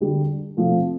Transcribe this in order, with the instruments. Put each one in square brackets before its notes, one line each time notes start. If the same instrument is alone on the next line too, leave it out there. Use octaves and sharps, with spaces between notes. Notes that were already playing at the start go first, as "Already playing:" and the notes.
[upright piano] D3 G3 D4
C3 F3 A3